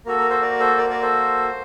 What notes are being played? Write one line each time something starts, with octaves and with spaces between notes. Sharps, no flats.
A#3 F#4 A4 A#4
A#4
A4 C5
A#4 D5
A4 C5
A#4 D5
A#4 D5
A4 C5